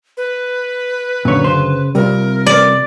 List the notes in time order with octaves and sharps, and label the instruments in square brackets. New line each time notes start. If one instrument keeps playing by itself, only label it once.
[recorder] B4
[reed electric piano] F#2 D3 [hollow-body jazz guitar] A#2 C#5
[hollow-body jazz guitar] C#3 C5
[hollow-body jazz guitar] C3 [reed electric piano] G3 C4 F4 [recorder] A#4
[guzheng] D5